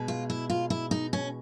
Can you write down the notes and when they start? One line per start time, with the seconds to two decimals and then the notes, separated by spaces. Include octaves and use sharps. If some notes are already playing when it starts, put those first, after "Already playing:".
Already playing: B2 G#3
0.08 F4
0.30 E4
0.50 F4
0.70 E4
0.91 D#4
1.13 C#4